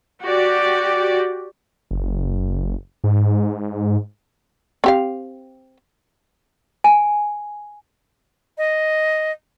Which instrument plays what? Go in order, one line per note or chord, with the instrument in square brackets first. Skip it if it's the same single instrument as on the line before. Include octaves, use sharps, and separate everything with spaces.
[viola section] F#4 G4 D5
[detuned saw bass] F#1
G#2
[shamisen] C4 G4 F5
[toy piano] G#5
[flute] D#5